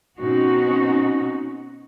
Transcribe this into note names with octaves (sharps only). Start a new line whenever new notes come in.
B2 C4 C#4 D#4 F#4